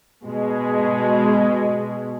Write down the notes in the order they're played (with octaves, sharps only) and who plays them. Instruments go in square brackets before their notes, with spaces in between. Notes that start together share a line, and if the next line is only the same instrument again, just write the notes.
[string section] B2 G#3